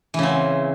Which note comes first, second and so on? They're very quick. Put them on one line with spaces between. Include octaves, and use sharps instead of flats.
E3 C#3 C4